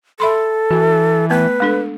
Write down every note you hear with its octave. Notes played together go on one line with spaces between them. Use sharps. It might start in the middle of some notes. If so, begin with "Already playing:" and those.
A4 E5 B5 C6
E3 F#4
A3 B3 B4
G#3 D4 A4